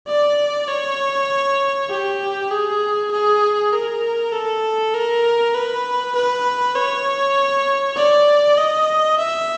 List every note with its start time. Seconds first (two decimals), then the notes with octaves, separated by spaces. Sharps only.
0.08 D5
0.68 C#5
1.90 G4
2.51 G#4
3.11 G#4
3.73 A#4
4.32 A4
4.94 A#4
5.54 B4
6.16 B4
6.75 C#5
7.97 D5
8.58 D#5
9.19 E5